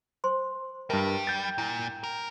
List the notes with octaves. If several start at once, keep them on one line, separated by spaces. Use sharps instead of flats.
C5 C6
G2 G3 A#4 E5 A5
G5 G6 A6
A#2 E4
A#4